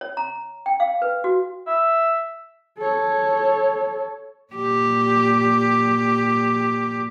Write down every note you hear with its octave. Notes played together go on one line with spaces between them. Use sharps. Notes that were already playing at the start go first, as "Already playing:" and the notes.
C#5
A#5
G5
F5
B4
F#4
E5
A4 C#5
A#2 G4